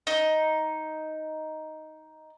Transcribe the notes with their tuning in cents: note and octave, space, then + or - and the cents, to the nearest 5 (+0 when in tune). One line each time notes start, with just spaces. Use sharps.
D#4 +5